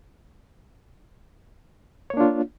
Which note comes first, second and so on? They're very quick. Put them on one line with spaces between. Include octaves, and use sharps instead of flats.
C#5 A#3 D4 F4